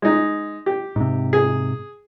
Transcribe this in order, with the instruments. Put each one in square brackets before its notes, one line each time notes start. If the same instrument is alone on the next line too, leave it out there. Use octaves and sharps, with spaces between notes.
[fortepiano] G#3 D#4
G4
[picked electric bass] G#2 C3
[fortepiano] G#4